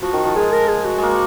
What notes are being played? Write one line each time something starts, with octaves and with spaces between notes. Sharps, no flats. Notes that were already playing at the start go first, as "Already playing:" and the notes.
F3 F#4
D#3
F3
G#3 G#4
A#4
G#4
F#4
G#3 A#3